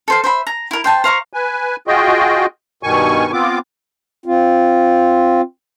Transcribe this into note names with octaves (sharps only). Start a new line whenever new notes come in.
A4 C5 F5
C5 E5 B5
A#5
E4 A#4
C5 G5 A5
C5 F5 A#5 C#6
B4 G#5
F4 F#4 G#4 D#5 G5
G2 B2 D#3 G#5 C#6
B3 C4 F4 D6
C4 F4